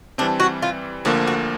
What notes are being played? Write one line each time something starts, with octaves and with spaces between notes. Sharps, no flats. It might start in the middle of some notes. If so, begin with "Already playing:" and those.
E3 G3 C4 D4
F#4
F4
D2 D3 F3 A#3 F#4
F#4